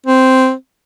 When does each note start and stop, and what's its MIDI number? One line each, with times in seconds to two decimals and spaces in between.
0.06 0.53 60